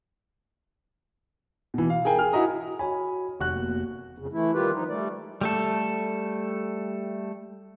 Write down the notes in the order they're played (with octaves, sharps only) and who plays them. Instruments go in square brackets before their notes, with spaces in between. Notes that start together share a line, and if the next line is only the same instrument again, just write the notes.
[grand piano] B2 E3
F5
G#4 A#4 G5 G#5
G#4 F6
E4 F#4 D#5 A#5 D#6
[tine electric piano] F#4 C#5 B5 [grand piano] G#5
[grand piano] F1 F#4 F#6
[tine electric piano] A#3 B3
[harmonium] F2 C#3
E3 A3 E4
D#3 G3 F4 G4 B4
F3 D#4
G3 A3 D5
[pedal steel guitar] G3 A3 A4